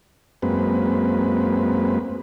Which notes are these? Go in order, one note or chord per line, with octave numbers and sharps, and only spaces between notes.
F#2 G#3 A#3 C4 B4